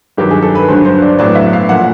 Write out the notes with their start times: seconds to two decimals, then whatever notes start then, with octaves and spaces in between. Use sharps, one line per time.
0.17 G2 D#3 F#3 G4
0.31 G#4
0.43 A4
0.55 B4
0.69 G2 D3 F#3 C5
0.85 C5
1.02 D5
1.19 A2 F#3 B3 D5
1.35 E5
1.53 F5
1.69 A#2 F3 A3 F#5